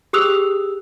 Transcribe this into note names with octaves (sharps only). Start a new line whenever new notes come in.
G4 G#4 D#6 E6 F#6 F7